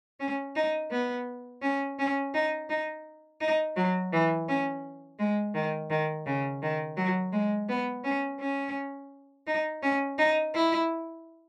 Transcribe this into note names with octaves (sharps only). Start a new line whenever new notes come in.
C#4
D#4
B3
C#4
C#4
D#4
D#4
D#4
F#3
E3
C#4
G#3
D#3
D#3
C#3
D#3
F#3
G#3
B3
C#4
C#4
D#4
C#4
D#4
E4